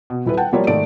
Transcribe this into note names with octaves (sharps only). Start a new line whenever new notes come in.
B2
D#1 E4 B4
F#5 G5 A5
F3 G3 A#3 F4 C#5 D5
G#2 D#3 A3 D5 D7